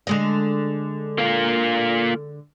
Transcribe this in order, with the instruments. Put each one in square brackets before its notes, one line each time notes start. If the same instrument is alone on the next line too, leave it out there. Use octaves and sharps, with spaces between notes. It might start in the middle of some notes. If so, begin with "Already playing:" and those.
[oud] D3 G#3 D#5
[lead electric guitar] A#3 F4